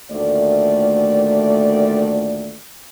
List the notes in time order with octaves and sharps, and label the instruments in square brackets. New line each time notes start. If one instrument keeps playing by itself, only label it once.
[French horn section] D2 A#2 D#3 A3 D5